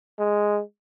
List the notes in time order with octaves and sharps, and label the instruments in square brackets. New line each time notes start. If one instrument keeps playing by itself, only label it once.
[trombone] G#3